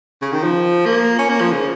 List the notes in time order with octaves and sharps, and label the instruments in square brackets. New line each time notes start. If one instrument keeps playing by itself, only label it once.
[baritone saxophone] C#3
D#3
F3
A#3
C#4
A#3
F3
C#3